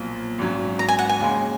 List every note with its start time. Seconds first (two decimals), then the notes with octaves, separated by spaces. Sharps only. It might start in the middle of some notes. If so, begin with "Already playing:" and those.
Already playing: B1 A#2 F3
0.38 G#1 G#2 F#3 C#4
0.79 A#5
0.88 G#5
0.99 F#5
1.09 G#5
1.19 D#2 C#3 G#3